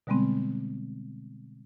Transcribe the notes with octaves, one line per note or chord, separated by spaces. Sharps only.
B2 D3 G3 G#3 B3 C4